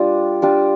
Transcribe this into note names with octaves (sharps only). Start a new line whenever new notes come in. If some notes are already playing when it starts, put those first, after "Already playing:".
Already playing: G3 D4 F4
G3 D4 F4